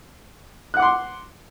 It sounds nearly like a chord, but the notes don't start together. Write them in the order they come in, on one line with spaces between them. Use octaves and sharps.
F#6 F#5 D6 C6